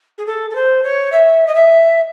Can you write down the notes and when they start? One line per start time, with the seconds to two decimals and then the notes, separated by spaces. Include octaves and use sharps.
0.18 G#4
0.26 A4
0.50 A4
0.55 C5
0.83 C#5
1.12 E5
1.46 D#5
1.54 E5